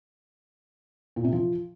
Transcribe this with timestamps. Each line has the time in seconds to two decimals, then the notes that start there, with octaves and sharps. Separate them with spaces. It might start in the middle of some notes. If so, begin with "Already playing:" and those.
1.16 A#2
1.24 C3
1.33 F3